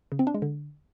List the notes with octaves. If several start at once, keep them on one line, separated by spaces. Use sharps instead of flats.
C#3
C4
D4
G#3
D3